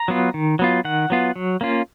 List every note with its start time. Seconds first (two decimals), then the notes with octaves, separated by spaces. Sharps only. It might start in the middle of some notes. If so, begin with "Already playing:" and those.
Already playing: A#5
0.08 F#3 B3 F4
0.34 D#3
0.59 F#3 B3 F4
0.85 D#3 F#5
1.10 F#3 B3 F4
1.36 F#3
1.61 A#3 C#4 F4